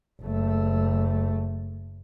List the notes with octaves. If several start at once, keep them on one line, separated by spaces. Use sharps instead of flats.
F#1 A3